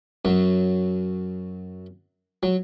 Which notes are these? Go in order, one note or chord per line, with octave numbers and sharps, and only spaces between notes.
F#2 F#3
F#3